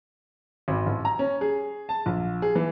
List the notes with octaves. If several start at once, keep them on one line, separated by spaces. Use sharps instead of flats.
G#1
A1
A#5
C#4
G#4
A5
A#1
G#4
E3